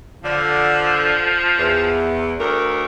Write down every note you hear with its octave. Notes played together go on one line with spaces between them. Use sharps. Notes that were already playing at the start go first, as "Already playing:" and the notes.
D3 F3
E2
D2 A#4